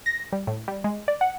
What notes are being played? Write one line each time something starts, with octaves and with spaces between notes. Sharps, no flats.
A#6
G3
A2
G3
G#3
D5
F#5